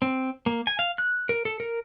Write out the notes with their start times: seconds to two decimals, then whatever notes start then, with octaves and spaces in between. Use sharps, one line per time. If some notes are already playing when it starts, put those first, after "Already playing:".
0.02 C4
0.46 A#3
0.67 G#5
0.79 F5
0.98 F#6
1.29 A#4
1.45 A4
1.60 A#4